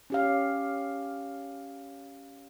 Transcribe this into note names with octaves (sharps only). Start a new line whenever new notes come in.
C#4 G4 F5